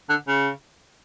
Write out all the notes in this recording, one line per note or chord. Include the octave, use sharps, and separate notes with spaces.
D3
C#3